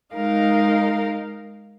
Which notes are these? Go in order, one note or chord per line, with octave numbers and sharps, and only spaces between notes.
G#3 D#4 A#4 F5